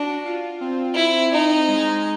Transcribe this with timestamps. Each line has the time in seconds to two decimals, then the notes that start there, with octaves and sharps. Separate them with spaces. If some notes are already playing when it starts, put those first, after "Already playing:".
Already playing: D4 F#4
0.25 F4
0.61 C4
0.96 E4
1.32 D#4
1.68 G#3